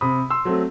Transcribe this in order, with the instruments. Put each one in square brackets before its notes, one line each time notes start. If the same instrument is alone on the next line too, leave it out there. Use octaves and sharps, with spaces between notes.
[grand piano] C3 B5 D#6
C6 E6
F#3 A3 C4